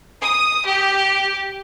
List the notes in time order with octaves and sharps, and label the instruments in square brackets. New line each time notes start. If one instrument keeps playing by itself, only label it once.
[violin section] D#6
G4